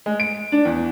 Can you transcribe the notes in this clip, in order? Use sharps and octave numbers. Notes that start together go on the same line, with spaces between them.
G#3
D7
D4
E2